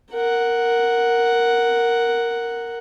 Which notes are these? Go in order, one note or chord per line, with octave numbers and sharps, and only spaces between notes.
A#4 F#5